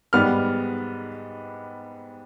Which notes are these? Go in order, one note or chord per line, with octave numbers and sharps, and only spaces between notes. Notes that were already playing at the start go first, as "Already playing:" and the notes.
G#2 G3 B3 F6